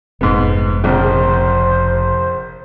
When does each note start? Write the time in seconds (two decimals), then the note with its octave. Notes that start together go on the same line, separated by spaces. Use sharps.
0.21 F1 G#2 B3
0.83 A#1 F2 C#3 C5